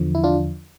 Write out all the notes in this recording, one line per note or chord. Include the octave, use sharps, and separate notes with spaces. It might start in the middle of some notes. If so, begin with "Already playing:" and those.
Already playing: E2 D3 F3
E4
D4 F4